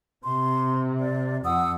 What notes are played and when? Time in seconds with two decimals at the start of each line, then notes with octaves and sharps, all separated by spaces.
0.23 C3 C6
1.00 D5
1.44 F2 F#5 D#6 E6